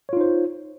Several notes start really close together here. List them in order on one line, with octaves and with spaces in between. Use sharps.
C#5 F4 D#4 C5